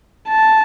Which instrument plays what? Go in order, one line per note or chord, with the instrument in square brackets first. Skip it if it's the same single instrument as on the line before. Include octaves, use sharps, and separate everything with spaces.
[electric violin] A5